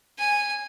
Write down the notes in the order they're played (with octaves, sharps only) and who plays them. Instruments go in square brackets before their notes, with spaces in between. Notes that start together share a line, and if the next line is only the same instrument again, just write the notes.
[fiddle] G#5